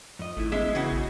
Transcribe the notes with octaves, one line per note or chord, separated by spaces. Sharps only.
F2 D#5
G#1 A3 E4
G#3 B3 C#4 E5
C#3 E3 E4 F#4 D#5
A1